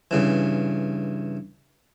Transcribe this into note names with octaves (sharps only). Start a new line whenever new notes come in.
G2 C#3 E3